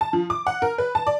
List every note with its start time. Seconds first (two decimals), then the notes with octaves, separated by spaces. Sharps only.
0.01 A5
0.13 F3
0.30 D6
0.47 F#5
0.62 A#4
0.78 B4
0.95 A5
1.07 D5